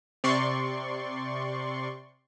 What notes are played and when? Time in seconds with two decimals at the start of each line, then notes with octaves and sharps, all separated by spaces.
0.24 C3 D5 C6 C#6